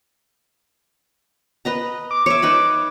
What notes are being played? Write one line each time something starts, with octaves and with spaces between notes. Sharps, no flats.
B4 D#5 A#5
D6
C#5 E5
D#4 B4 B5